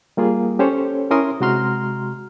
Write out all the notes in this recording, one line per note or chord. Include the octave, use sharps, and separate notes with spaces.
G3 A#3 F4 G#4
C#4 G4 A4 C5 C#5
C#4 E4 A#4 C6 D#6
C3 G#3 F#4 A#5 C6 F6